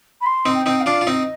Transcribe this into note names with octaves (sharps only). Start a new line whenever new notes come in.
B5
C6
C4 D#4
G5
C4 D#4
F5
D4 F4
F4
C4 D#4 D#5